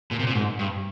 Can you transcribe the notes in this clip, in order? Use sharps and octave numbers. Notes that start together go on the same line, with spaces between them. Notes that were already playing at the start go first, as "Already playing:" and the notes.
A#2
C3
A#2
G#2
G2